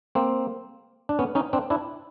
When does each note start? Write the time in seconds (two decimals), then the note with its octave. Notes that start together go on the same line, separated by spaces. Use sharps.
0.15 A#3 C4
1.09 D4
1.19 B3 C#4
1.35 C#4 D#4
1.53 C4 D4
1.70 D4 E4